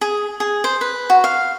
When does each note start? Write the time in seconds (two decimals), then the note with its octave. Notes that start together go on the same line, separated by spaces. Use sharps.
0.01 G#4
0.40 G#4
0.64 C5
0.81 B4
1.10 F#4
1.24 F5